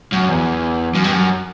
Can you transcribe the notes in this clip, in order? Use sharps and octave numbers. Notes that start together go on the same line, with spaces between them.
F#2
E2
F#2
G2
F#2